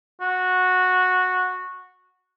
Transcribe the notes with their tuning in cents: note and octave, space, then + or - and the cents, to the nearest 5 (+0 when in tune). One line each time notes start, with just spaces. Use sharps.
F#4 -10